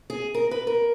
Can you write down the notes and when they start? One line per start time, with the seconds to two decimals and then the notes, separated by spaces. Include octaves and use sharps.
0.10 G#4
0.34 A#4
0.51 B4
0.67 A#4